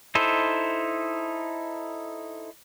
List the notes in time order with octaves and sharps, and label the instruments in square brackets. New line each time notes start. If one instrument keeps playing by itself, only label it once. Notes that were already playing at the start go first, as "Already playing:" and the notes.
[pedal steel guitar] D#4 E4 A4 C5